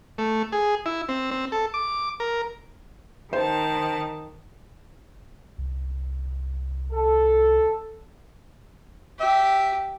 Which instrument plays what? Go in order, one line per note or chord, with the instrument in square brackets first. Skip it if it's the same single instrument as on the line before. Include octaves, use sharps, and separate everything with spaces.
[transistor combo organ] A3
G#4
E4
C4
C4
A4
D6
A#4
[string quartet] D#3 A5 [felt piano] C5
[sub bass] C2
[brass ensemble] A4
[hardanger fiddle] G4 [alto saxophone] E5